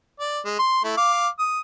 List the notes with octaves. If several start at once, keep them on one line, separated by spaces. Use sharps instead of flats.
D5
G#3
C6
A3 E4
F5 D6
D#6